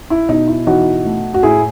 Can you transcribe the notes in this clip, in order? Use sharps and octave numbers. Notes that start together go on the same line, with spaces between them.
E4
B2 D#4
E4
E3 D#4 F#4
A3
F#4
A2 E4 G#4